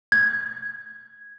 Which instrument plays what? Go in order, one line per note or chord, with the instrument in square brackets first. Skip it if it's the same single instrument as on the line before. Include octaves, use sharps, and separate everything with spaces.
[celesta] G#6